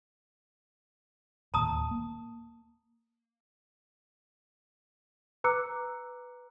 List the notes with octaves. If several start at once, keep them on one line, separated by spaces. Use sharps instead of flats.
D1 D#2 A#2 A5 A#5 D#6
A#3
B4 A#5 D6 E6 F#6 C#7